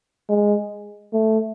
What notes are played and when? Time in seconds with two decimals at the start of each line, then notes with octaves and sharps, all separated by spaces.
0.29 G#3
1.13 A3